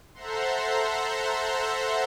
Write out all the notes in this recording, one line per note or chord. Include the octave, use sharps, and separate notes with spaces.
A4 C5 E5 F#5 A#5 C6